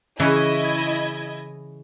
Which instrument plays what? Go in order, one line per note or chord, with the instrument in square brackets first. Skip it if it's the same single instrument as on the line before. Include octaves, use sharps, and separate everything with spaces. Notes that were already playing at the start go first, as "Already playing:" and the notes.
[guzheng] C#3 E3 C#4 [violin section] E4 D#5 G#6